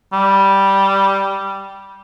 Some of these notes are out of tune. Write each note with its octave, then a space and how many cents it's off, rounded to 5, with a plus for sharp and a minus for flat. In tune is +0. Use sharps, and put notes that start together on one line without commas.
G3 -5